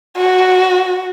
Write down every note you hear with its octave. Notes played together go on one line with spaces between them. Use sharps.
F#4